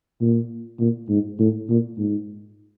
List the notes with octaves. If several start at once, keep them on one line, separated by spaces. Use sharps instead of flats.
A#2
A#2
G#2
A2
A#2
G#2